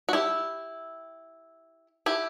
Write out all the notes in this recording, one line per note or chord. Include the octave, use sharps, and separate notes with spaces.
F#4
E4 G4
E4 G4